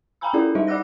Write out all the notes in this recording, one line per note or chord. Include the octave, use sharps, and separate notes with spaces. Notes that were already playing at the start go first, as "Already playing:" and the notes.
F5 G5 G#5 A#5 B5 E6
C#4 E4 F4 G#4 A4 D5
G3 D#4 G4 C5 D#5 E5
D5 F#5 D6 E6 F#6 A#6